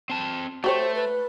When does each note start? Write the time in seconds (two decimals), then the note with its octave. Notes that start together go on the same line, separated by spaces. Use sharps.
0.10 C4 A5
0.64 A3 F#4 G4 C5 C#5
0.95 B4